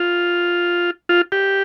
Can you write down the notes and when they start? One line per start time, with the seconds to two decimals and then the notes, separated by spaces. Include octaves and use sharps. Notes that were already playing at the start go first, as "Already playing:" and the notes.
Already playing: F4
1.09 F4
1.32 G4